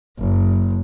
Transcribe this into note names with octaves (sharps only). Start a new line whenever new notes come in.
F#1